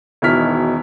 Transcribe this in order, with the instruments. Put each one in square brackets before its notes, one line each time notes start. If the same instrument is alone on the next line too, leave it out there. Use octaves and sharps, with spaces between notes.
[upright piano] E1 B2 D#3 E4 F6 B6